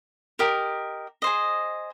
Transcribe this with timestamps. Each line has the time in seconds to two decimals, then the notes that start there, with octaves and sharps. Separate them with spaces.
0.39 G4 A#4 D#5
1.22 G#4 C5 D#5